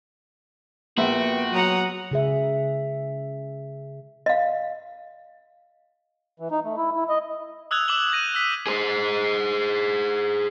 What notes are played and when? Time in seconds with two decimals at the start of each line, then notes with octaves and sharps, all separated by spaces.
0.98 A#1 B3 F#4 E5 G5
1.52 F#3 F#5 A#5 D#6
2.11 C#3 G#4 E5
4.26 D#5 F5
6.40 E3
6.51 D#4
6.64 A3
6.77 E4
6.96 E4
7.09 D#5
7.71 D#6 E6 F#6 G#6 F7
7.88 D6 E6 E7 F#7 G7
8.10 D6 E6 G6 A#6 D#7
8.35 E6 B6
8.67 G#4 C5